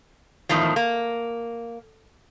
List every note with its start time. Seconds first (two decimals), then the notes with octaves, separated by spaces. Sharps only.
0.49 E2 A2 D#3 F3
0.76 A#3